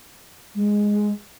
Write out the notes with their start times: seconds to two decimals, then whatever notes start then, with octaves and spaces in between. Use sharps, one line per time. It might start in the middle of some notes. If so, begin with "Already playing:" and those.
0.55 G#3